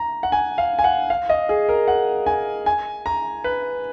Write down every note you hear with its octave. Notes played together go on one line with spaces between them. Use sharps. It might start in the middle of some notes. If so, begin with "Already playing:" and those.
Already playing: A#5
F#5
G#5
F5
G#5
F#5
F5
D#5
G#4
A#4
F#5
G#5
G#5
A#5
B4